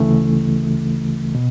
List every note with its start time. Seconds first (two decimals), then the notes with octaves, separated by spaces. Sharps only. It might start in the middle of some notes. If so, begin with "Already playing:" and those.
Already playing: D2 C#3 E3 A3
1.35 B2